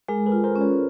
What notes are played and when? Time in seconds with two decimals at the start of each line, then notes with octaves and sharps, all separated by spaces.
0.09 G#3 G#4 A#4
0.26 A4 B4
0.32 F4
0.44 A#4 C5
0.56 C#4
0.61 B4 C#5